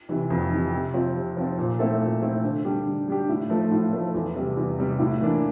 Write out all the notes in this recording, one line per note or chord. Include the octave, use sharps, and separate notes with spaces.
C3 E3
F2
C3 E3
C3
F3 C4 F4
C3
F3 C4 F4
A#2
A3 C4 E4 A4
A#2
A3 C4 E4 A4
D3
G3 D4 G4
D3
G3 D4 G4
A2
F3 A3
A2
F3 A3
E2
C3 G3
E2
C3 G3
A2
E3 A#3 D4